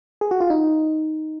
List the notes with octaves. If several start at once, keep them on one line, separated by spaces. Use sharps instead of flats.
G#4
F#4
F4
D#4